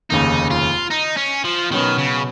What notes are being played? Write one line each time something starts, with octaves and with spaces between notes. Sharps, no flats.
F1 D#2 C#3 D#4
F4
D#4
C#4
F3
B2 D#3 F#3 C#4 F#4 B4
C#3